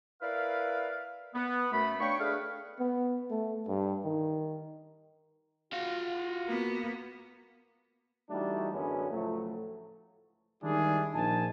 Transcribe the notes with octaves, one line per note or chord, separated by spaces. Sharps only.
E4 A#4 B4 D5 F5
B3
F#2 A3 B5
D4 C#5 F5 G5 B5 C#6
A3 D4 G#4 B4 F5
B3
A3
G2
D#3
F4 F#4 F5
A#3 B3
E3 G3 A3 D4 D#4 F#4
F#2 D3 F#3 G#3 B3 C#4
C#2 A2 F3 F#3 A3
D#3 G3 G#3 D4 E4 G#4
A#1 F3 D#4 G#5 A5